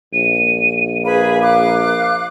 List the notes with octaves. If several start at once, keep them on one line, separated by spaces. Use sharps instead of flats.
A#1 D#7
A#3 G#4 B4 B5
F5 D6 F#6